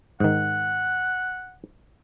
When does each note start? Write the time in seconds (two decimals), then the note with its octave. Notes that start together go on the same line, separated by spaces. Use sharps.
0.20 G#2 D#3 F#5